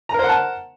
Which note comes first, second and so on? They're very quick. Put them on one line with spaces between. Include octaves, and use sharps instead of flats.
A#5 A#4 C5 F#5 A5